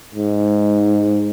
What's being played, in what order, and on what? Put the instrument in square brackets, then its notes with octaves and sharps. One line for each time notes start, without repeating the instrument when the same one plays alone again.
[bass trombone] G#2